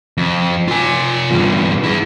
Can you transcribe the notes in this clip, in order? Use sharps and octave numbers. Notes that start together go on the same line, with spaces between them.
F2
F4 G#5
E2 G2
E4 G#4